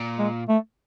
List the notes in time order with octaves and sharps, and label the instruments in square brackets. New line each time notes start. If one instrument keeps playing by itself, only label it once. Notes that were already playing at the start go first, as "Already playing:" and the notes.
Already playing: [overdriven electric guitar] A#2
[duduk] G#3
A3